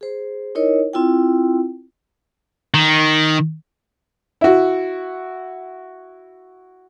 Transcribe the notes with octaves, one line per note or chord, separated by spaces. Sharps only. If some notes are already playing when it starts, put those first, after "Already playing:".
G#4 C5
D#4 E4 A#4 C#5 D#5
C4 E4 F4 G5
D#3
E4 F#4